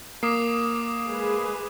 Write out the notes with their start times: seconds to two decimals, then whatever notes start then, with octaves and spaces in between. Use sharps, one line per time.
0.23 A#3 D6 D#6 C7
1.06 G#3 G#4 B4